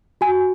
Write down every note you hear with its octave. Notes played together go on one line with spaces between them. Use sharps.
F#4 G#5